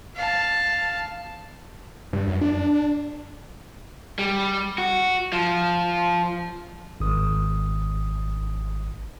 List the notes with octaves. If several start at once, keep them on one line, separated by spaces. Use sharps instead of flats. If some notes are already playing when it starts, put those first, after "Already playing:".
F5 A5
G2
F#2
D4
G3
F#4
F3
G#1 D#6